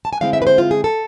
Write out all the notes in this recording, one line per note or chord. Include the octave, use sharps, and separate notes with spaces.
A5
G#5
D3 G#3 C4 E4 F5
E5
B4
C5
F4
G#4
A4